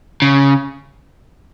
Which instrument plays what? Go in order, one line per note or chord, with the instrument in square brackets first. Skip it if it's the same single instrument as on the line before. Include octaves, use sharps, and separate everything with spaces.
[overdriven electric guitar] C#3